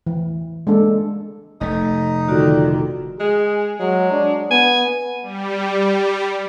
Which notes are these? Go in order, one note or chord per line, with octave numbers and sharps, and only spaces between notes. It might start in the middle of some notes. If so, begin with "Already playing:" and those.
E3
G#3 A#3 D4 A4
F1 A3 D#4
D3 D#3 F4 F#4 D5
G#3 G#4
F#3 G#3
D4
B3 G#5
G3